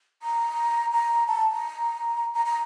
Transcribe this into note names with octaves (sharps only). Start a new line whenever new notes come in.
A#5
A#5
A5
A#5
A#5
A#5